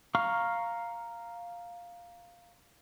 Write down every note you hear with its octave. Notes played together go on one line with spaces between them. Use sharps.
F5 A#5 C#6 F6